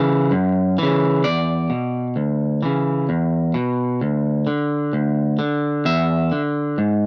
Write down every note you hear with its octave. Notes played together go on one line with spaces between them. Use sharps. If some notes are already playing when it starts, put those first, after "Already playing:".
Already playing: C#3 E3
F#2
C#3 E3
E2 D5
B2
D2
C#3 E3
E2
B2
D2
D3
D2
D3
E2 E5
D3
G#2